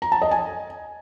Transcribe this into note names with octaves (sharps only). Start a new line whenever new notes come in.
A#5
A5
D#5
G#5